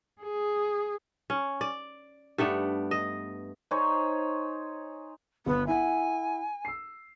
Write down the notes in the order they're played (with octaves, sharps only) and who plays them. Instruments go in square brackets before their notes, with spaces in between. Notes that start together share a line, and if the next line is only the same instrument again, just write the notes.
[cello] G#4
[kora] C#4
D5
G2 A3 B3 D4
D#5
[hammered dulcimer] D#4 G#4 C5 C#5
[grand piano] G1 [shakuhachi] B3
[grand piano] E4 F#5 [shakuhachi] G#5
[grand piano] E6 C7